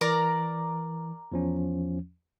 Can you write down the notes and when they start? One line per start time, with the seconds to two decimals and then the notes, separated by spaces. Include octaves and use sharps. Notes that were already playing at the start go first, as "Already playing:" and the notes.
0.01 E3 A#4 D5 A#5
1.32 E2 F3 C#4